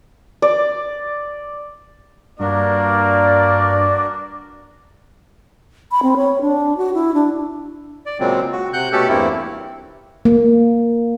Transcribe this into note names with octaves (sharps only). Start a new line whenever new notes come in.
D5
G2 A#3 D4 F#4 A#4 D5
B5
C4
C#5
D4
F#4
E4
D4
D5
A#2 C#3 F#3 G#3 C4
F#4
C3 F#5 F#6 G6
B2 A3 C#4 G4 A4
E2 G2 A3 A#3 C4 E4
A#3